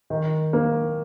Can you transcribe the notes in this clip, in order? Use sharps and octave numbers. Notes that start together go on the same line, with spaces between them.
D#3
A#3